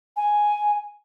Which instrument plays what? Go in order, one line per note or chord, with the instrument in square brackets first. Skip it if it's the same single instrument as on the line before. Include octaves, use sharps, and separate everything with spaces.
[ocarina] G#5